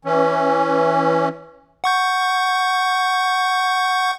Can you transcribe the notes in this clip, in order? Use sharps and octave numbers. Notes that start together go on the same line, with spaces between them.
E3 C#4
F#5 C#6 G6